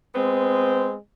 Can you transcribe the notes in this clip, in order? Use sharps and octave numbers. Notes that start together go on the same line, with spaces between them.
G#3 B3 C4